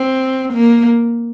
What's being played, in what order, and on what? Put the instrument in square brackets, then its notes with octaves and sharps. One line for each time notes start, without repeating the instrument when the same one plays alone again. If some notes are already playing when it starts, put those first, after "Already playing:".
Already playing: [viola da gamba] C4
A#3